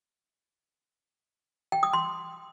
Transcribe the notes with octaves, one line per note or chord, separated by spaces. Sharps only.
G5
D#6
C6